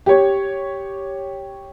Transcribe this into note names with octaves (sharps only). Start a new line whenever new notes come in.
G4 C#5